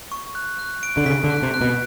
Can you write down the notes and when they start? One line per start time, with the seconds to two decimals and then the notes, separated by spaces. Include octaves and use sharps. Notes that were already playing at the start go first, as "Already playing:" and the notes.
0.12 C#6
0.35 F#6
0.59 F#6
0.83 D7
0.97 D3
1.06 C#3 B6
1.24 D3
1.30 F#6
1.42 C3
1.54 F#6
1.61 B2